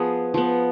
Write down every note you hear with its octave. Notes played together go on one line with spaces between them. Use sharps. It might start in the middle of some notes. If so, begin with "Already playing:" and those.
Already playing: F3 B3 G#4
F3 B3